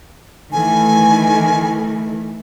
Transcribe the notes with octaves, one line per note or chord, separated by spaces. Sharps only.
D#3 E3 A3 G#5